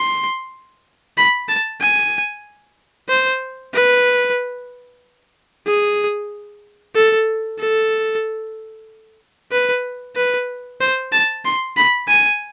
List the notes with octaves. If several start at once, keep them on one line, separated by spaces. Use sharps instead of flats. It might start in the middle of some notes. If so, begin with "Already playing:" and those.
Already playing: C6
B5
A5
G#5
C5
B4
G#4
A4
A4
B4
B4
C5
A5
C6
B5
G#5